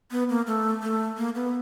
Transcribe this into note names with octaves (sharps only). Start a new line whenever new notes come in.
B3
A#3
A3
A3
A#3
B3